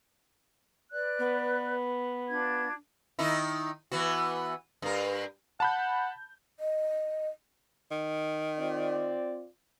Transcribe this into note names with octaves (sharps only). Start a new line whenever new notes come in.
B4 D5 F#6
B3
D4 F4 G#6
D#3 D#4 E4
E3 B3 F#4
G2 A#4
F#5 A5 B5 G6
D#5
D#3
C4 F4 D5